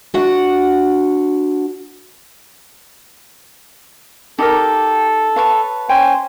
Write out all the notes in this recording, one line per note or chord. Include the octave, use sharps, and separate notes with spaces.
D4 F#4 F#5
D#4 G4 A4 A#4
B4 C#5 F5 A5
C#4 C5 G5 G#5